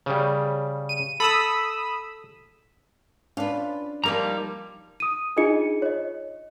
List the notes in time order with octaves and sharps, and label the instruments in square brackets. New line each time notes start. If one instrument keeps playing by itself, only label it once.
[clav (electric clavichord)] C#3 G3
[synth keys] D#7
[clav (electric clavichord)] A4 [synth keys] B5 D#6 E6
[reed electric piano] C#4 D4 [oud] F4 B4
[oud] F3 A#3 D#4 [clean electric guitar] G3 A#5
[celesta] D#6 D#7
D4 D#4 F4 G#4 D#5 C#7
C#5 D#5